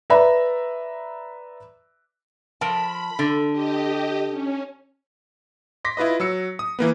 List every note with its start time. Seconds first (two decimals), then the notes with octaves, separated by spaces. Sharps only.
0.10 B4 D5 E5 A#5 B5
2.61 F3 A#4 A5 B5
3.19 D3
3.52 G4 D#5
4.30 C#4
5.85 C6 D6 A#6 B6
5.97 E4 F4 B4 D#5
6.20 F#3 E6 C#7
6.59 D#6
6.79 E3 A#3 B3